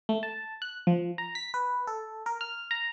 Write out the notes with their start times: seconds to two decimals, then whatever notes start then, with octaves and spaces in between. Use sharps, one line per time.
0.09 A3
0.23 A5
0.62 F#6
0.87 F3
1.18 A#5
1.35 B6
1.54 B4
1.87 A4
2.26 A#4
2.41 F6
2.71 A#5